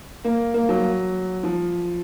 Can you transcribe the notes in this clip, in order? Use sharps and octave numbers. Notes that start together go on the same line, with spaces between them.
A#3
A#3
F#3
F3